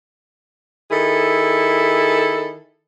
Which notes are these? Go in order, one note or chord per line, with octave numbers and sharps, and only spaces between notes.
D#3 E4 G#4 A4